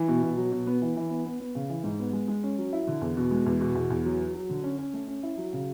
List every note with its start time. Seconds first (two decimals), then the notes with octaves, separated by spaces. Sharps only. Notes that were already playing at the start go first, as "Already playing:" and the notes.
Already playing: E3
0.08 B2
0.23 B2
0.37 F#3
0.52 B2
0.67 B3
0.82 E3
0.96 E3
1.10 B3
1.26 B3
1.40 B3
1.55 C#3
1.70 E3
1.84 G#2
1.99 B3
2.13 G#3
2.28 G#3
2.43 C#4
2.58 F#3
2.73 E4
2.87 D3
3.01 E2
3.17 B2
3.31 G#3
3.46 E2
3.61 B2
3.75 E2
3.90 E2
4.05 F#3
4.20 F#3
4.34 F#3
4.49 D3
4.64 C#4
4.78 C#4
4.94 A3
5.08 C#4
5.23 E4
5.37 F#3
5.53 C#3